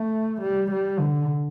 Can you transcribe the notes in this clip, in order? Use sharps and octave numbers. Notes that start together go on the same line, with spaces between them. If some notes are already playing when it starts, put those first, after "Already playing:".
Already playing: A3
G3
G3
D3